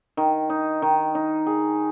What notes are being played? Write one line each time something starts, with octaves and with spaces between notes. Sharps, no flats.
D#3
D#4
D#3
D#4
G#4